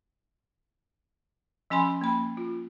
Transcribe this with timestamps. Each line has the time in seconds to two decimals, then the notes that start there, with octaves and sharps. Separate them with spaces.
1.70 F3 C#4 G#5 B5 C6
2.01 A#3 B5
2.37 F4